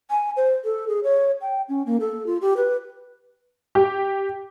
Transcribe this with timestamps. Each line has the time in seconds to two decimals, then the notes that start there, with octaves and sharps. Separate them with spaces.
0.10 G#5
0.37 C5
0.64 A4
0.88 G#4
1.04 C#5
1.41 G5
1.69 C#4
1.86 A#3
2.00 A4
2.27 F4
2.41 G4
2.57 B4
3.75 G4